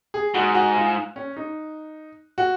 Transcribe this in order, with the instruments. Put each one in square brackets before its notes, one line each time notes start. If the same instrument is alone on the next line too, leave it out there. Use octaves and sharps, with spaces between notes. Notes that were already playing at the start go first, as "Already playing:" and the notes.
[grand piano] G#4
[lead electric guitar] G#2 [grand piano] F#4
[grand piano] F#4
F4
C#4
D#4
F#4